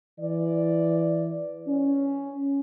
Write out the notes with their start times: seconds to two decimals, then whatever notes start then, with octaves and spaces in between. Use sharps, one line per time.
0.19 E3 D5
1.67 C#4